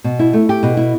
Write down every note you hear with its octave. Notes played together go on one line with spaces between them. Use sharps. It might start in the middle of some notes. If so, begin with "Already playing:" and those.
B2
E4
A3
G4
B2
E4